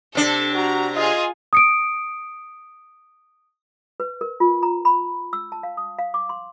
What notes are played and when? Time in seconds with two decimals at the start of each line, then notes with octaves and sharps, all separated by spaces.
0.15 C3 D4 A4
0.55 F#4 A#5
0.96 F4 G#4 D#5
1.53 D#6 C#7 D7
4.00 B4
4.21 A#4
4.40 F4
4.63 A#5
4.85 B5
5.33 E6
5.52 A5
5.63 F5
5.77 D#6
5.99 F5
6.14 D6
6.29 C6